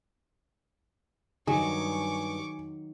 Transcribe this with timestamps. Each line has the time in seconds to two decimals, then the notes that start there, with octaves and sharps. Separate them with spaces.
1.47 G2 D#3 F#3 G#4 C#6 D6